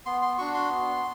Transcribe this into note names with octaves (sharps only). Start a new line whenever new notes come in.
B3 C6
C6
D4 F#4 C#6
C6
B3